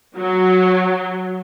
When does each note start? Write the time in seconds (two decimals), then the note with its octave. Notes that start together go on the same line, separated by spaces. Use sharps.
0.16 F#3